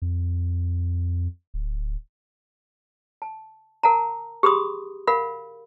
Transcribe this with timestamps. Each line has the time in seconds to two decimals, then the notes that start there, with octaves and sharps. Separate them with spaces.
0.02 F2
1.54 D1
3.22 A5
3.83 A#4 F#5 A5 A#5
4.43 G4 G#4 B5 C6 D#6
5.07 A#4 F5 F#5 B5